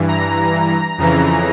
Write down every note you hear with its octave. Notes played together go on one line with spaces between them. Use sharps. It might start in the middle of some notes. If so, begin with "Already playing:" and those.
Already playing: G2 E3
A#5
F2 C#3 E3